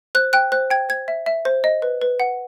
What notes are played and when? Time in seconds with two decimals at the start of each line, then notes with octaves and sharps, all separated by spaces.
0.15 C5 F#6
0.33 G5 F#6
0.52 C5 F#6
0.70 G5 G#6
0.89 C5 G#6
1.08 E5
1.26 E5
1.45 C5
1.64 D#5
1.82 B4
2.01 B4
2.20 F#5